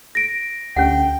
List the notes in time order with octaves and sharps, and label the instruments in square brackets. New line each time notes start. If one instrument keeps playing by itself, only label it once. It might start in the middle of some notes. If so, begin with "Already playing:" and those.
[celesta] A#6 D7
[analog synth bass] D2 [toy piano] C#4 G4 F#5 [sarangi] G5